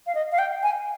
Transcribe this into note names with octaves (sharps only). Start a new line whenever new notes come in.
F5
D#5
F5
G5
G#5